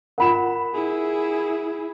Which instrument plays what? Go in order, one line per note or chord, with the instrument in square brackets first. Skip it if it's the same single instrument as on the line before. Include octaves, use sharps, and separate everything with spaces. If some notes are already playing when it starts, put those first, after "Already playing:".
[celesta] F4 A#4 [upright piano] F#5 B5 E7
[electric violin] E4 G#4